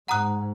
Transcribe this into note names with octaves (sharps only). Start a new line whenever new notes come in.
G#2 F#5 A#5 D#6 F#6